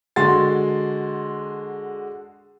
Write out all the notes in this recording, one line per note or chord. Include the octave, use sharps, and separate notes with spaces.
D3 G#3 F#4 C6 A6